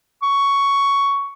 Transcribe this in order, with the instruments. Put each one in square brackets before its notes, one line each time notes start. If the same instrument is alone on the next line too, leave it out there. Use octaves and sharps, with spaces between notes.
[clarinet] C#6